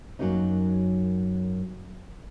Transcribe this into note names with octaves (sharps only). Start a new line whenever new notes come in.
F#2 F#3 A3 A#3 C#4 D#4